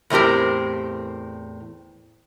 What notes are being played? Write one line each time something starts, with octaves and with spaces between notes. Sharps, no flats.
E2 A2 C4 G4 A#4